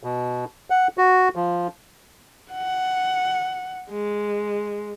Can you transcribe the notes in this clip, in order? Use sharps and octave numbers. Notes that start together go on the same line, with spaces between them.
B2
F#5
F#4
F3
F#5
G#3